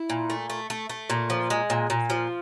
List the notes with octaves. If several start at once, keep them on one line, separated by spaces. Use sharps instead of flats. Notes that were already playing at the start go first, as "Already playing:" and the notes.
Already playing: E4
A#2
A3
A3
A3
A3
A#2
F3
G#3
A#2
A#2
F3